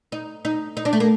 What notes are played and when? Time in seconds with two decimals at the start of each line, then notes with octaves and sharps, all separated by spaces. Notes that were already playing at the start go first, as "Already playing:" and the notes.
0.12 D#4
0.45 D#4
0.77 D#4
0.85 D4
0.93 A3
1.00 A#3